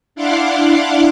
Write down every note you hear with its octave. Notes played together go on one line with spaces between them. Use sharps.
D4 E4 F5 F#5 C6 D6